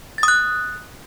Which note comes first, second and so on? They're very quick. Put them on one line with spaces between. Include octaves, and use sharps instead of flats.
A6 D#6 F#6